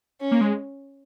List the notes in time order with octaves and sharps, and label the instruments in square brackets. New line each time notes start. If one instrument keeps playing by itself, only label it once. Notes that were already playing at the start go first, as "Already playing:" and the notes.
[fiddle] C#4
[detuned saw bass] A#3
G#3